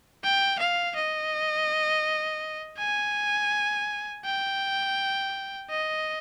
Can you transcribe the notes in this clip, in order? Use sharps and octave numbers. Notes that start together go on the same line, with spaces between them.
G5
F5
D#5
G#5
G5
D#5